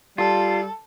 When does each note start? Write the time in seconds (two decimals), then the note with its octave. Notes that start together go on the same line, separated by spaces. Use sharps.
0.18 G3 F4 A4